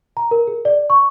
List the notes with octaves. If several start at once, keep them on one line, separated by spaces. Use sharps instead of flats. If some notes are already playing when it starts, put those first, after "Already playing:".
A#5
A#4
G#4
D5
C#6